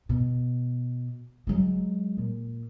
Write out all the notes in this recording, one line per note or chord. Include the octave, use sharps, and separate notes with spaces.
B2
F#3 G#3
A#2